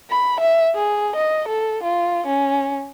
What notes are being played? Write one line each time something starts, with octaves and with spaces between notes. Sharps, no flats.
B5
E5
G#4
D#5
A4
F4
C#4